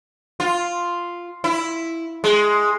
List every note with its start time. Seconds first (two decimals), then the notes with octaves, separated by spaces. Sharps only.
0.40 F4
1.44 E4
2.24 G#3